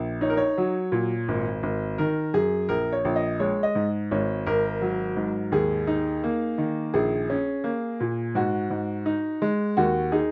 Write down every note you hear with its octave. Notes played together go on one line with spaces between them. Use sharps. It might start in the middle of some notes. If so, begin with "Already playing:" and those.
Already playing: A#1
D#4 C#5
A#4
C#5
F#3
A#2
G#1
G#1
D#3 A#4
F#2 G#4
A#1 A#4
C#5
A#1
D#5
G#3 C#5
D#5
G#2
G#1 C#5
G#1 A#4
F#3
G#2
D#2 G#4
D#4
A#3
D#3
A#1 G#4
C#4
A#3
A#2
G#2 F#4
G#2
D#4
G#3
D#2 F#4
D#4 G#4